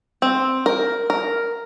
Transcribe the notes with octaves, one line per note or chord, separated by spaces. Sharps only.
C4
A#4
A#4